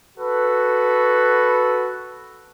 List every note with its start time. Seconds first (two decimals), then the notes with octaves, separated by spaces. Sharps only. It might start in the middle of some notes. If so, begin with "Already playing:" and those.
0.17 F#4 A4 B4